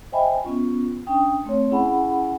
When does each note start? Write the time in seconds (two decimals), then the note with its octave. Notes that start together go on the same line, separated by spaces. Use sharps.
0.12 C5 D#5 E5 G5 G#5 B5
0.44 B3 C#4 F4
1.07 C#4 D4 G5 D#6
1.45 A3 C4 C#5
1.71 C#4 E4 G#4 F#5 G#5 B5